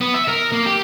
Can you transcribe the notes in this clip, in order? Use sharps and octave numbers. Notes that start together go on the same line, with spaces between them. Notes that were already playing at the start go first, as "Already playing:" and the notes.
B3
E5
A#4
A#3
G4